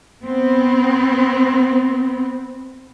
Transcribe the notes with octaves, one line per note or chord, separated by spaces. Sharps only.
B3 C4